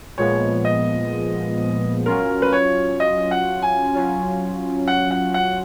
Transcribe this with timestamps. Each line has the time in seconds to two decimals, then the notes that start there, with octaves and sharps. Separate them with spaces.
0.18 A#2 F3 G#3 B3 C#5
0.65 D#5
2.06 F#3 C#4 F4 A#4
2.42 B4
2.53 C#5
3.00 D#5
3.31 F#5
3.62 G#5
3.94 F#3 C#4 F4
4.88 F#5
5.11 F#5
5.34 F#5